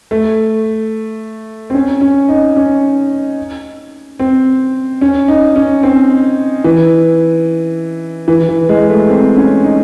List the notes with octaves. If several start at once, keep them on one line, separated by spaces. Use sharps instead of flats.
A3
C4
C#4
C#4
D#4
C#4
C4
C#4
D#4
C#4
C4
E3
E3
E3
G#3
A3
C4
C#4
D#4